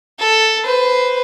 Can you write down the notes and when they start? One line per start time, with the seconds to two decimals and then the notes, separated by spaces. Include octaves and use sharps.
0.19 A4
0.64 B4 C5